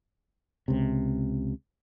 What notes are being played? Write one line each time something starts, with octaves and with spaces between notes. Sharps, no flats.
C#2 C3